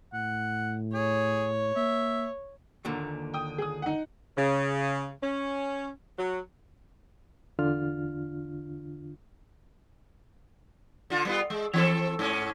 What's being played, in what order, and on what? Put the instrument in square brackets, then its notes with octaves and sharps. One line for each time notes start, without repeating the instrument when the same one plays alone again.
[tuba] A2 [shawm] F#5
[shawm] G#4 [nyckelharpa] C#5
[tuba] A#3 [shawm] E5
[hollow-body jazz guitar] D#2 A#2 D3
[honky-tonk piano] G5 D#6
G#4 D#6
D#4 F#5
[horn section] C#3
C#4
F#3
[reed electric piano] E2 D3 D4 F4 F6
[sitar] D3 F4
G3 B3 F4
G#3
E3 C4 A4
G#2 C#4